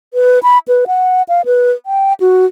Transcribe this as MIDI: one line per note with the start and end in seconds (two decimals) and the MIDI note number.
0.14 0.39 71
0.43 0.58 83
0.68 0.85 71
0.87 1.23 78
1.29 1.45 77
1.45 1.72 71
1.86 2.13 79
2.20 2.46 66